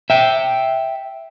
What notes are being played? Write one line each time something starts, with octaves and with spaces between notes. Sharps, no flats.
E5 G5